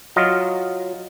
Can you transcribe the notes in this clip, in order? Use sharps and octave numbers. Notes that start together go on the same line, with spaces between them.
F#3 F4 D#5